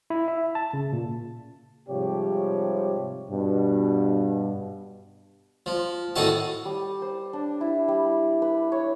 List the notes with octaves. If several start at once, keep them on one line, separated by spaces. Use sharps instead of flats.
E4
E5
A5
C#3
A#2
G#2 C3 F3 G3 G4 C#5
G2 B2
F3
A2 D#3 D#4 F#4 A4 A5
G3
C5
D4
E4
G3
B4
C#5